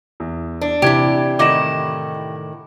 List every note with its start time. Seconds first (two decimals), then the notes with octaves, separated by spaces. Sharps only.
0.20 E2
0.61 D4
0.82 C3 E3 E4 G4 D5 G#6 D7
1.39 A2 D#3 F#5 D6 A#6 E7